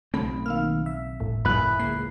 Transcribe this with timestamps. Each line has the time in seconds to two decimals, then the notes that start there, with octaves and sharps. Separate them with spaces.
0.14 B1 C#3 A3 C4 B5
0.46 D#3 A#3 F5 E6 F6
0.86 E5
1.20 G1 E2 A2
1.45 F2 A#2 C#3 E4 G#4 B5 F#6
1.79 C#2 A#3 C7